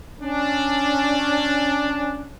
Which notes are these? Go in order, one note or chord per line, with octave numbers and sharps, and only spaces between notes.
C#4 D4